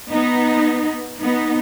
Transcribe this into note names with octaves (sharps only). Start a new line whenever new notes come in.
B3 D#4
B3 D#4